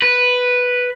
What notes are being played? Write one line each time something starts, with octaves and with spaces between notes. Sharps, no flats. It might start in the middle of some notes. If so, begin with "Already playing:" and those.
B4